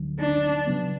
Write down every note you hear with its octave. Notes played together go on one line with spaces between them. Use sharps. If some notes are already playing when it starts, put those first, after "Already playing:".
Already playing: D2 D3 F#3
D4
C#3 F#3 B3